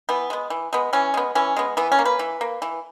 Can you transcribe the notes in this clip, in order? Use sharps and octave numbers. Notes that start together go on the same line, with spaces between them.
E3 B3
G#3 B3
E3
G#3 B3
E3 C#4
G#3 B3
E3 C#4
G#3 B3
E3 B3
C#4
A#3
B4
E3
A#3
E3